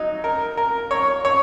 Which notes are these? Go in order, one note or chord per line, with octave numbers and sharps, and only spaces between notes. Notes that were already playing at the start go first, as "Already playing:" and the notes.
Already playing: F#3 D#4
A#4
A#4
C#5
C#5